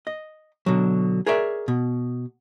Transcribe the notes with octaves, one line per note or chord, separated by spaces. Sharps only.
D#5
B2 D3 F#3
G#4 A#4 C#5 D5 E5
B2